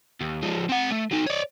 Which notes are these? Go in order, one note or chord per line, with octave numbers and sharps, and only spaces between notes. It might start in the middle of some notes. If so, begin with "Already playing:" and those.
D#2
F3 G#3
C4 F#5
A3
F#3 D#4
C#5 D5